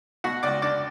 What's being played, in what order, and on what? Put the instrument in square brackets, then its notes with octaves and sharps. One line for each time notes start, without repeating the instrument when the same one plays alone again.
[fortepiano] B2 F#4 F#5
C#2 D5 D6
D4 D5 D6